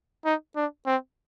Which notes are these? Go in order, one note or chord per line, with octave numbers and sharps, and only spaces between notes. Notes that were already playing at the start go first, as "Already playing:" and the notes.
D#4
D4
C4